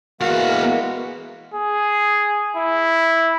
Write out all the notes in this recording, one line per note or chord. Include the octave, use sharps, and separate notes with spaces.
E3 G#3 A#3 B3 F#4 A#4 F5
G#4
E4